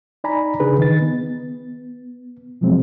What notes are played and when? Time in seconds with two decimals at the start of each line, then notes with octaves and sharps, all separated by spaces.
0.24 D#4 D5 G#5 A#5 B5
0.60 C#3 D4 D#4 G#4 B4
0.78 D#3 D#4 A6
1.02 B3
2.61 B2 F3 F#3 G#3 C4